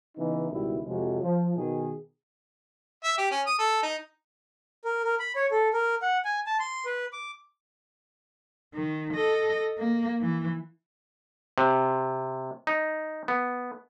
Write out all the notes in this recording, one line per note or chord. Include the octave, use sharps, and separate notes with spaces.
C#3 E3 B3 D#4
C#2 B2 D#3 G3 B3 E4
F2 C3 F3 F#3 G#3
F3
B2 D#3 G#4
E5
G4
C#4
D#6
A4
D#4
A#4
A#4
B5
C#5
A4
A#4
F#5
G#5
A5
C6
B4
D6
D#3
A4 D#5
A#3
E3
C3
D#4
B3